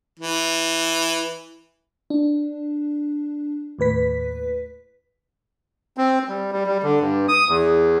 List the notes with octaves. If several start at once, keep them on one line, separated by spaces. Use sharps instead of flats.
E3
D4
D#2 A2 B4 B6
C4
G3
G3
G3
D3
G2
D#6
E2